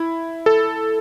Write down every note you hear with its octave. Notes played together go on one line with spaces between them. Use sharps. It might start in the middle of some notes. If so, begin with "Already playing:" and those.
Already playing: E4
A4